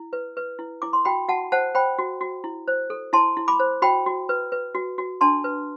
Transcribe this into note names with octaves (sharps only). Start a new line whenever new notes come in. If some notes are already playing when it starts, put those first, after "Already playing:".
Already playing: E4
B4
B4
E4
E4 D6
C6
F#4 G5 B5
F#4 F#5 A5
C5 F#5 A5
C5 G5 B5
F#4
F#4
E4
C5
A4
E4 A5 C6
E4
B5 D6
C5
F#4 G5 B5
F#4
B4
B4
F#4
F#4
D4 A5 C6
B4